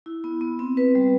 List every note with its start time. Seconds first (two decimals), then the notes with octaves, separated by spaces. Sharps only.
0.06 E4
0.24 B3
0.41 B3
0.59 C4
0.77 B4
0.95 G3